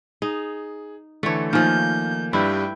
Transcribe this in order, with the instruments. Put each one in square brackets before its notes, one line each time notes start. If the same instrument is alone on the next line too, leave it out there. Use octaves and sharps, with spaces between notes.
[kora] D#4 [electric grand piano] G#4
[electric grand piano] D3 E3 [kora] A3 C#5
[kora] D#3 F3 [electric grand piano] A#3 G#5 [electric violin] G6
[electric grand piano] G2 G3 [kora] E4 [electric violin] B4 G5